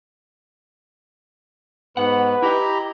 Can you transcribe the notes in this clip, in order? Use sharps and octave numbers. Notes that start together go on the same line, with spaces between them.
G#2 B3 B4 F#5
E4 G4 D#5 A#5 B5